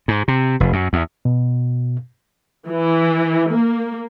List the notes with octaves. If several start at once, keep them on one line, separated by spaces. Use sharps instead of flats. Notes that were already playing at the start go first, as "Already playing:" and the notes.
G#2
C3
F1
F#2
E2
B2
E3
A#3